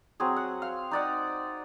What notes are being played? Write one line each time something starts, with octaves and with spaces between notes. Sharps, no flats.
F#3 C4 G#4
F#5
F5
D#4 D5 F#5